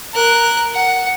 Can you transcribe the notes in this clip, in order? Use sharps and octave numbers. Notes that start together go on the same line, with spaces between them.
A#4 F#6
F#5